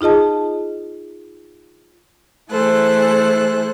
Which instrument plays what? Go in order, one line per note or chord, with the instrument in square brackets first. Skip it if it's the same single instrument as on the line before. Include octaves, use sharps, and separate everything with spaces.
[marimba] D#4 F4 G#4 D#5 A5
[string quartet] E3 A3 G#4 A4 C5 F#6